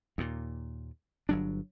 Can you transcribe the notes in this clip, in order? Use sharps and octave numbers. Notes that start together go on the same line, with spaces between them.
D#2 A#2
G1 F#3 D4